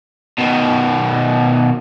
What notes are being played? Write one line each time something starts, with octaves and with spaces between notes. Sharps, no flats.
B2 D#3